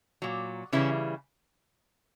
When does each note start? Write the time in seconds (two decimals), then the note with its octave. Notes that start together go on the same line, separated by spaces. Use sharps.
0.22 A#2 F#3
0.73 C#3 E3 G3 C#4 E4